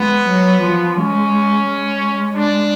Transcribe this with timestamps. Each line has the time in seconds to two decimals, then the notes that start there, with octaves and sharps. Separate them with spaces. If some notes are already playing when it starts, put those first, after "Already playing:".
Already playing: G#3 B3
0.28 F#3
0.62 F3
0.97 G#3 C#4
1.66 G#3
2.35 D4